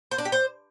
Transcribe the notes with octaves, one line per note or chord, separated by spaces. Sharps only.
C5
D4
G4
C5